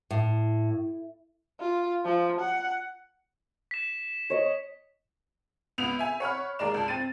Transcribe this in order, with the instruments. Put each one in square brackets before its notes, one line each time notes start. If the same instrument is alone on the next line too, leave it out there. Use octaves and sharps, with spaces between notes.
[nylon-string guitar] A2
[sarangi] F4
F3
F#5
[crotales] B6 E7
[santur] C#5 D#5
[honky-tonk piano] C#2 B3 F7
E5 G#5
C#5 F#5 B5 F6
D#2 G#3 A#4 D5 E7
C#2 A5
C4 A6 D#7